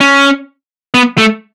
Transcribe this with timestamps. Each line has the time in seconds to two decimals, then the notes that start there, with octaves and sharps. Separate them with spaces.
0.01 C#4
0.94 B3
1.18 A3